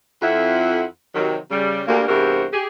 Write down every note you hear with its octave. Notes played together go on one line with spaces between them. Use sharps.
F2 E4 F#5
C3 D#3 F#3
C#3 G3
D2 G3 A#3
E2 G2 C3 F#4 A#4 C5
G4 G#4